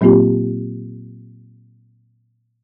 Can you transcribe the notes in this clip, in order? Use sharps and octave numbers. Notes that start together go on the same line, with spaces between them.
A#2 F#3 A#3 C4 F4 G4